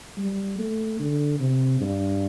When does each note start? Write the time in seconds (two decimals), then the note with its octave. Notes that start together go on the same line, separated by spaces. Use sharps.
0.17 G3
0.58 A3
0.99 D3
1.40 C3
1.81 G2